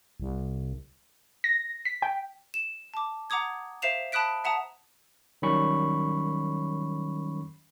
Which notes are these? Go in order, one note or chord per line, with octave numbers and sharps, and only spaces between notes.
C2
A#6
B6
G5
E7
A5 D6
F#5 A#5 D6 D#6 G#6
C5 E5 F5 C7 E7 F7
A5 B5 D#6 F#6 B6 D7
E5 F#5 A5 A#5 D#6
D#3 F#3 G3 C#4 B5 C#6